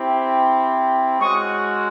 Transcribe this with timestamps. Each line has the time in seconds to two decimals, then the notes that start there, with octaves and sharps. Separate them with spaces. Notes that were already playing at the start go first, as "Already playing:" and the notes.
Already playing: C4 E4 G4
1.19 G#3 C#4 F#4 C#6 D#6